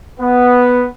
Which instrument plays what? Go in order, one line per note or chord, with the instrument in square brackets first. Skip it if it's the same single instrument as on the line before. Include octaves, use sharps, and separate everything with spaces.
[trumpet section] B3